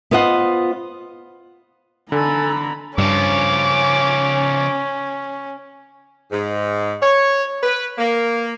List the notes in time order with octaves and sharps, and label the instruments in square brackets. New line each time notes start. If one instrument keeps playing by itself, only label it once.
[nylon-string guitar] B3 F4 C5 D#5 F#5
[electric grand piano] D3 [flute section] A4 G#5 [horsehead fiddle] A#5 B5
[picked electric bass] G2 [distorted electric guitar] C#3 F3 [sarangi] C#4 [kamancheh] D6
[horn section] G#2
C#5
B4
A#3